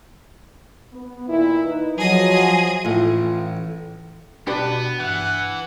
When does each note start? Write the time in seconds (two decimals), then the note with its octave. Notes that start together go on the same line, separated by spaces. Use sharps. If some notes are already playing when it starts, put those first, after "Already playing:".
0.93 B3
1.28 A#2 D#3 E4
1.65 D#4 B4
1.98 F3 F#3 G#4 D#5
2.85 A1 F4
4.47 B2 B3 D4 G4 B4
5.00 G2 E3 F#5